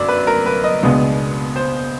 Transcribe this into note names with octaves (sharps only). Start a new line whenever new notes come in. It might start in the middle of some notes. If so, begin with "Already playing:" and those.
Already playing: G1 F#2 D5
B4
A#4
B4
D#5
C#2 B2 G#3 B3 D4
C5